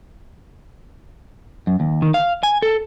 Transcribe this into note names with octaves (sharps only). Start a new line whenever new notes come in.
F#2
D#2
D#3
F5
G#5
A4